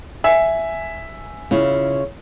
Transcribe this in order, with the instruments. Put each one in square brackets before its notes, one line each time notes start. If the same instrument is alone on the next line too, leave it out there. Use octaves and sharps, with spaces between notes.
[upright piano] E5 G#5
[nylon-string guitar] C#3 E4 F4